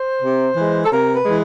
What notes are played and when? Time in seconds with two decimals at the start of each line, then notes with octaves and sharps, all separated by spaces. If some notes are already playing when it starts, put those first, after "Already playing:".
Already playing: C5
0.22 C3
0.56 E3 G#3
0.85 A4
0.91 C3 A#4
1.14 B4
1.26 E3 G#3